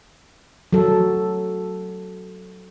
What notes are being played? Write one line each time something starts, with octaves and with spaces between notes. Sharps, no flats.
F#3 A4